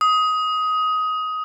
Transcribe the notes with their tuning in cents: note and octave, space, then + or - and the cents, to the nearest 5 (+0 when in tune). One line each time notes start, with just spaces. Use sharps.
D#6 +15